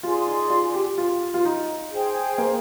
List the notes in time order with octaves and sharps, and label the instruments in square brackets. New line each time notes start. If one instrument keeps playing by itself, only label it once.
[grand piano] F4 [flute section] G#4 D5 G#5 C6
[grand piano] D#4
F4
G4
F4
F4
D#4
[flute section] G#4 C5 G5
[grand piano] A#3